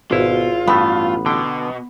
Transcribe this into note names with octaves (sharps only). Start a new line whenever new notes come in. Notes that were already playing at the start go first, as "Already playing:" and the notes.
G#1 B2 E4 F4
A1 G2 A3 B3
B2 D3 G5